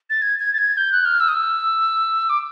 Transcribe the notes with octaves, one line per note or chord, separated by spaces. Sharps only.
A6
G#6
G#6
A6
G#6
G6
F#6
F6
E6
D#6
E6
D6